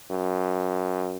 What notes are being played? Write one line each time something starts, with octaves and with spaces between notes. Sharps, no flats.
F#2